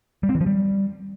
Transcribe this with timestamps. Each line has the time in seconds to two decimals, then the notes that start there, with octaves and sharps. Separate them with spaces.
0.23 G3
0.29 C4
0.35 E3
0.41 F3
0.46 G3